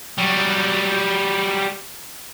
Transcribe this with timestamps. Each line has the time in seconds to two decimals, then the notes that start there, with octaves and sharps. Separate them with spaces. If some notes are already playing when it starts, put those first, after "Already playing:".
0.18 F#3 G3